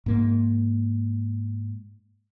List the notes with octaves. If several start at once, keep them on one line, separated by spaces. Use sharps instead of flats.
G#2 A#3